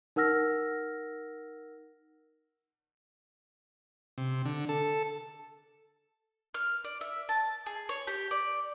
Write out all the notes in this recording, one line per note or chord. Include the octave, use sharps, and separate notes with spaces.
D#4 A#4 F#5 E6 F6 A#6
C3
D3
A4
F6
D5
E5
A5
G#4
C#5
G4
D5